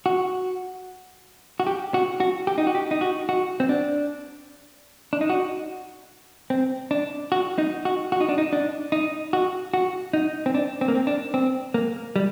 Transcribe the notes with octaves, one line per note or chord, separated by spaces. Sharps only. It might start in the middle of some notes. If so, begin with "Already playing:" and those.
F#4
F#4
G4
F#4
F#4
G4
D#4
F#4
G4
D#4
F#4
F#4
C4
D4
D4
D#4
F#4
C4
D4
F#4
D#4
F#4
F#4
D#4
D4
D#4
D4
D#4
F#4
F#4
D#4
C4
D4
C4
A#3
C4
D4
C4
A#3
G3